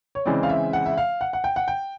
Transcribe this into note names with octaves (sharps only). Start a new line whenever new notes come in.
C#5
C#3 E3 G#3 C4 D5
F5
E5
F#5
E5
F5
F#5
F#5
G5
F#5
G5